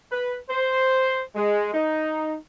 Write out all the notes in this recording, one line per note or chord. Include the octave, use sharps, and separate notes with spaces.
B4
C5
G#3
D#4